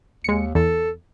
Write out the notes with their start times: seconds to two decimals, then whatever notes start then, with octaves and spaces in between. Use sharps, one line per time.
0.24 D#2 G#3 C#7
0.55 E2 A4